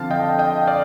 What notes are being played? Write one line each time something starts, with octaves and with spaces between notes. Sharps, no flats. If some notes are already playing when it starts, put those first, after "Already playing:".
Already playing: D3 F3 C4 F5 A5
D#5 G5
D#5 G5
D5 F5